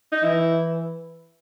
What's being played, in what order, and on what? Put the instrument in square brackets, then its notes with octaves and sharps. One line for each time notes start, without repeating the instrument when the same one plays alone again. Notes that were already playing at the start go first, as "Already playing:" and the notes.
[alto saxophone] D#4
[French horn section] E3 [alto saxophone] E4